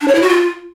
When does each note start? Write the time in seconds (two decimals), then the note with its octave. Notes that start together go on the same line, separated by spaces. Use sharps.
0.01 D4
0.08 C#5
0.15 E4
0.22 F#4
0.29 F4